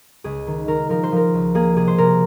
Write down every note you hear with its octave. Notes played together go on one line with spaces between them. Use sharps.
C#2 G#4
D#3
D#3 A#4
F3 A#4
C5
F3 A#4
C#2
A#3 G#4
C3 G#4
C5
C3 A#4